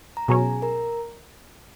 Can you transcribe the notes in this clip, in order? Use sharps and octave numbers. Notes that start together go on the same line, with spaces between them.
A#5
B2 F#3 C#4 G#4 G#5
A#4 A#5